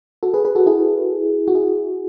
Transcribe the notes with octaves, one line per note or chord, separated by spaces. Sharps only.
F#4 A4
G#4 B4
G#4 B4
F#4 A4
E4 G#4
F#4
E4 G#4